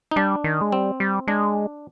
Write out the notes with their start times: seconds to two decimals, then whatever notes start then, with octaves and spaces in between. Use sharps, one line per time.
0.11 D#4
0.16 G3 D4
0.44 D#3
0.61 G#3
0.72 G3 C4
1.00 G3
1.27 G#3 D4